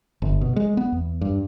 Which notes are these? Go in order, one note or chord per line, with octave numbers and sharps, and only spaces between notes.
G1
B2
G#3
B3
E2
G2